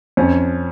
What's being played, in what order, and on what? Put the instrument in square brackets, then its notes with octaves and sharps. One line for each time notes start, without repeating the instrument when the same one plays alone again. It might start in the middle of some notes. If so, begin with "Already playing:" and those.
[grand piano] F2 [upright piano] C#4 C#5